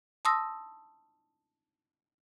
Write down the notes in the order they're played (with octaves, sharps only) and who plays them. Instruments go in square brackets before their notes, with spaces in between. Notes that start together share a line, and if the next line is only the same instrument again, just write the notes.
[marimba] A5 C6 D#6 E6 A#6